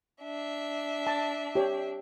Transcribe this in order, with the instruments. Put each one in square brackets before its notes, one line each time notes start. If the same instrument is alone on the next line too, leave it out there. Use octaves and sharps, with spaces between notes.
[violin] D4 E5
[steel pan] A5
G4 C#5 D5